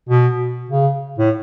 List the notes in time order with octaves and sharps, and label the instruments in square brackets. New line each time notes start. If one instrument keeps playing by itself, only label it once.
[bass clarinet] B2
C#3
A2